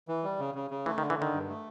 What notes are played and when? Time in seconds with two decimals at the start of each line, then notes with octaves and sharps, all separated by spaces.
0.08 E3
0.24 G3
0.39 C#3
0.55 C#3
0.70 C#3
0.86 E3 A3
0.98 D#3
1.02 D3
1.10 E3
1.17 D3 D#3
1.33 G2
1.48 A3